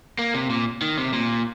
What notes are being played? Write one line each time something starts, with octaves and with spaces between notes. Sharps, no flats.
A#3
C3
A#2
D#3
C3
A#2